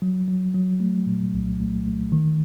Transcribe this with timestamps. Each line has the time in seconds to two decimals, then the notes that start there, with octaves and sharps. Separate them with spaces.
0.02 F#3
0.28 F#3
0.54 F#3
0.80 A3
1.06 A#2
1.33 C2
1.60 A3
1.85 A3
2.12 D#3